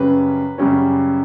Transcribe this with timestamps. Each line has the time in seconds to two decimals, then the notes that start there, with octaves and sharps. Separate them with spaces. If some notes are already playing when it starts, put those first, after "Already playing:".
Already playing: F#2 C#3 G3 C#4 B4
0.58 F#2 C#3 G3 C#4